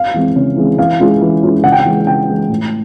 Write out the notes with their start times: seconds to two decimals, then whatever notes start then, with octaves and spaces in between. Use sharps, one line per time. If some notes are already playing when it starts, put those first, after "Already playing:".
Already playing: F5
0.14 E3 G#3 C4
0.36 C#3
0.56 E3 G#3 C4
0.78 E3 F5
1.00 G#3 C#4 F4
1.21 E3
1.43 G#3 C#4 F4
1.64 C#3 F#5
1.72 G5
1.80 F#5
1.85 E3 G#3
2.07 C#3 G5
2.29 E3 G#3
2.49 A2